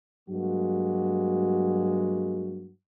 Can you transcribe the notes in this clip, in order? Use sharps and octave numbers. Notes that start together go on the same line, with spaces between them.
G2 F#3 G#3 A#3 F#4